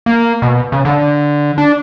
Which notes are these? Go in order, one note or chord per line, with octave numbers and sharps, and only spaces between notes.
A#3
B2
C#3
D3
D4